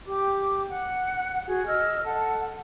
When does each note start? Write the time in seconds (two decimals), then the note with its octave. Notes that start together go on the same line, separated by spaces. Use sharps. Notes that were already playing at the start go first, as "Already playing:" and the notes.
0.06 G4 D6
0.68 F#5
1.47 F#4 G#4
1.66 D#5 E6 F6
2.04 A4 F#5